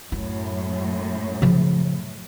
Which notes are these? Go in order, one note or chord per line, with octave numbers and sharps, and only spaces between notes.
F#2 A2 E4
C#3 F3